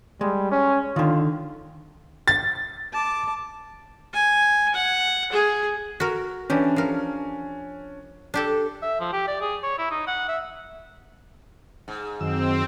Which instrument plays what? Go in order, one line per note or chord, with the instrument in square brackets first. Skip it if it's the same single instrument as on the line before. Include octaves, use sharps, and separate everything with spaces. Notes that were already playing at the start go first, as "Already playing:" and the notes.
[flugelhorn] G3 [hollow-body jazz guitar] G#3
[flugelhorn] C#4
[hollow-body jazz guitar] D3 D#3 [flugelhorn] F4
[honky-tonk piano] A6
[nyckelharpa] A5 D6
G#5
F#5
G#4
[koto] F#4 A#4
[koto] E3 G4 [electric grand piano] C#4 D4
[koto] F3 A#4
D4 G4 A4
[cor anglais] E5
F3
G4
D5
G#4
C#5
E4
D#4
F#5
E5
[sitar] G#2
[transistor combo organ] F#2 D#3 E6 [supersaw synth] C4